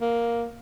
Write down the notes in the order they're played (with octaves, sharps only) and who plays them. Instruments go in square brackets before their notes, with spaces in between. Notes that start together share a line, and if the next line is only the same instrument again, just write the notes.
[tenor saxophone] A#3